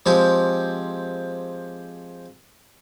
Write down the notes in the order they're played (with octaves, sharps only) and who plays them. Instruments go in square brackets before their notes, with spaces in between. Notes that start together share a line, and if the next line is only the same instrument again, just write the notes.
[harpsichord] F3 G#3 C4 G4